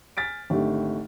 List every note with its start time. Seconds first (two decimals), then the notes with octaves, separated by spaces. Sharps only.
0.17 G#5 F6 A6 B6 D7
0.50 G#1 D3 A3 G4